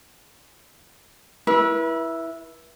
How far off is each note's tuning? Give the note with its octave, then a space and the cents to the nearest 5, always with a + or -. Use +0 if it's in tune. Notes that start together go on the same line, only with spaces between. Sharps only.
E4 +0 B4 -35